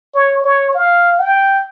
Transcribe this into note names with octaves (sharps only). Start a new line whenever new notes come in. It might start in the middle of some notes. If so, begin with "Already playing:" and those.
C#5
C#5
F5
G5